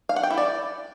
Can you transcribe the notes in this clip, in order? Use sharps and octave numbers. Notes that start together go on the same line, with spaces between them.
F5
F#5
G5
E4
D5